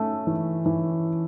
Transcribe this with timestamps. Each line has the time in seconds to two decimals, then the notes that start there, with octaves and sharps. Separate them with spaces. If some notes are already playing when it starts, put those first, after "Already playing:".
Already playing: A3 C#4
0.27 E3
0.66 E3